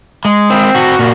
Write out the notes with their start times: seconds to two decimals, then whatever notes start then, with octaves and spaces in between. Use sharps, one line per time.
0.25 G#3
0.50 C4
0.75 F#4
0.99 A#2